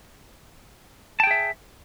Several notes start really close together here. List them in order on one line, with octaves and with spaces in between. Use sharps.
A5 G5 G#4 E5